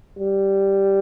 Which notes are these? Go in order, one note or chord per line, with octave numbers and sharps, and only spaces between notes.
G3